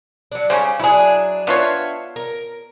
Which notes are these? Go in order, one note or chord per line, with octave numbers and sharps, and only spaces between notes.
F#3 D4
C#3 G3 C#4 C5
F#3 D4 E4 G#4
B3 D4 F4 C#5 E5 F5
A#4